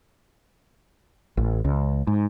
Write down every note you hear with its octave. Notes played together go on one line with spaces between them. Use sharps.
A1
C#2
G#2